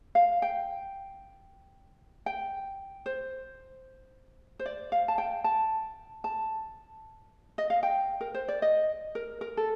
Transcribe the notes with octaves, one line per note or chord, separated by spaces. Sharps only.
F5
G5
G5
C5
C5
D5
F5
A5
G5
A5
A5
D#5
F5
G5
A#4
C5
D5
D#5
A#4
A#4
A4